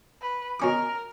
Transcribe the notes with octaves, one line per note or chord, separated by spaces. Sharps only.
B4
B2 C#4 A#4 D6